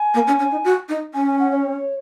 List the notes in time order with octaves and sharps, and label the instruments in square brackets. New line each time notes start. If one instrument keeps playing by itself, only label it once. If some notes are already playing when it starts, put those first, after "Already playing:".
Already playing: [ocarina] G#5
[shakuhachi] A#3
C#4
C#4
D#4
F#4
D#4
[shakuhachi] C#4 [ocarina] G#5
[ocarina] G#5
F#5
C#5